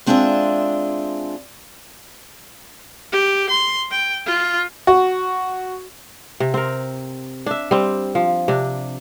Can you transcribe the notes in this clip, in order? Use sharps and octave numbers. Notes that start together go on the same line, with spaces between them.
G#3 C4 D4 F4 G#4 E5
G4
C6
G5
F4
F#4
C3
C4 A#4
D4 E5
G3 C4
F3
C3 D4